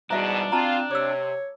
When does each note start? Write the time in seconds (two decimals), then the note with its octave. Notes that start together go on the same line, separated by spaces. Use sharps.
0.11 E2 G#2 B2 G3 D4 F#4 E5 A#5
0.52 C4 F4 A5 A#5
0.91 C3 C#5 D6 E6